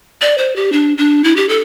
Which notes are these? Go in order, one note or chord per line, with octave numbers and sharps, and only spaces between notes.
D5
C5
G4
D4
D4
E4
G4
A4